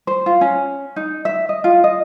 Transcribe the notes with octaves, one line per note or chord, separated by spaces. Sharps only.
C5
F4
C#4
D#4
E5
D#5
F4
D#5